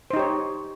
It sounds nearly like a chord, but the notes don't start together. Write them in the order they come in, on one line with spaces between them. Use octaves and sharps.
C5 D#4 G4 C#5